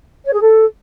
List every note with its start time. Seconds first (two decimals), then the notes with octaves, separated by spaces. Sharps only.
0.24 C#5
0.33 G#4
0.41 A4